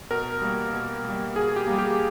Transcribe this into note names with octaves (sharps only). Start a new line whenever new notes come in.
B2 A#4
G3 A#3
B2
G3 A#3
B2 G#4
G4
G3 A#3
G4